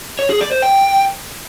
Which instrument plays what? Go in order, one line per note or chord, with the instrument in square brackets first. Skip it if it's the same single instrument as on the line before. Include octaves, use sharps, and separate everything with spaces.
[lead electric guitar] C#5
G#4
D5
C5
G5